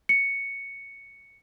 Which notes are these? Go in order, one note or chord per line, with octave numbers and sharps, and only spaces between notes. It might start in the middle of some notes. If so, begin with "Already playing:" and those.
C#7